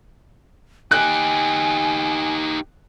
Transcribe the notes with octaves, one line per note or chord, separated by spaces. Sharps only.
D#4 G4 G#5 F#6